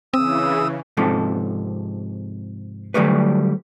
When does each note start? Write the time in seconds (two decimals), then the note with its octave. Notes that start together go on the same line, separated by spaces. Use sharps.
0.14 C#3 E3 C4 D#6 E6
0.97 G#2 C3 F3 A4
2.94 D3 F#3 G3 A3 B4